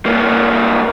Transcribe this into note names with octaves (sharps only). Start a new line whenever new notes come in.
G2 A#3